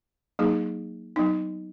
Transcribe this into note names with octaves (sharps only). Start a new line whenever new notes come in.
F#3 A#3 D#4 G#4
F#3 B3 D#4